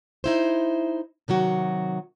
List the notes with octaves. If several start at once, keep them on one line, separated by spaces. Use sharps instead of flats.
D#4 E4 C5
C3 D#3 F#3 F#4